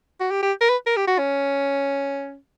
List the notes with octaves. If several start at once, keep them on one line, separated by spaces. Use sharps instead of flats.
F#4
G4
G4
A#4
B4
A#4
G4
F#4
C#4